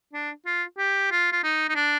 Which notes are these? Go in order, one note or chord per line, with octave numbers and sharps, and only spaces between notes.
D4
F4
G4
F4
F4
D#4
D#4
D4